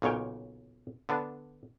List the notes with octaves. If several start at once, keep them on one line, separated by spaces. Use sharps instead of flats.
B1 A#2 C#3 C#5 G5
D3 B3 D4